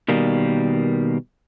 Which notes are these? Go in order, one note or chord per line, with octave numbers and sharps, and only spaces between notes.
B2 D#3 G3 A#3